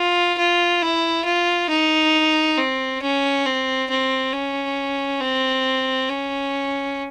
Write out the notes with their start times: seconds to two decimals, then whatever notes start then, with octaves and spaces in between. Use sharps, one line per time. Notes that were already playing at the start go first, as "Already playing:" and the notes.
Already playing: F4
0.38 F4
0.82 E4
1.25 F4
1.69 D#4
2.57 C4
3.01 C#4
3.46 C4
3.89 C4
4.33 C#4
5.20 C4
6.09 C#4